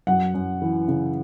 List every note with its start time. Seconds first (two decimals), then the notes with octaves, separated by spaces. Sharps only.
0.07 F#2 F#5
0.34 F#2
0.62 E3
0.88 C#3